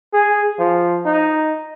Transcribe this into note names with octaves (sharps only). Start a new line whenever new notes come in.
G#4
F3
D#4